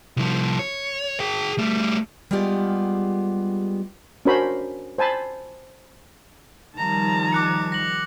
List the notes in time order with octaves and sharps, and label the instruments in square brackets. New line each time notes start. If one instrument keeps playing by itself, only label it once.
[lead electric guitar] C2 F3
C#5
G#4 G5
G3 A3
[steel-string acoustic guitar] G3 G#3 B3 F4 G4
[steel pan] C#4 D4 F#4 A#4 C5 B5
C5 G#5 A5 B5
[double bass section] D#3 F3 G3 [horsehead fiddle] A5 A#5
[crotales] D6 F#6 C#7
A#6 F#7